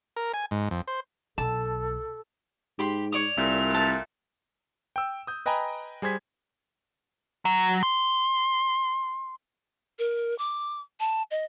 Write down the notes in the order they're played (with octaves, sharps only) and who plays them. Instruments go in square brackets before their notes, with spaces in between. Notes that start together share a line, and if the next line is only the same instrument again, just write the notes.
[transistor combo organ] A#4
G#5
G#2
F2
C5
[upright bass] B1 [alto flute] A4 [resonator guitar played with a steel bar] A5
[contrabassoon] G#2 [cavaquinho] G4 B5 C6
[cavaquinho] C#5 D5 D#6 [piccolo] F7
[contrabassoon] C2 [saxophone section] A#2 A3
[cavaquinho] B4 A5
[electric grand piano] G5 E6
D#6 G6
B4 D#5 G5 G#5 A#5 B5
G3 G#4 C5 G#6 B6
[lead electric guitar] F#3
C6
[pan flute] A#4
D6
A5
D#5